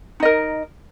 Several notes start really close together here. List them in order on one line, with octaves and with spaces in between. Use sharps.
D#4 D#5 A#4